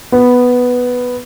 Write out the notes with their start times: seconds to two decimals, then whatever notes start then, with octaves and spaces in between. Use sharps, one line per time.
0.12 B3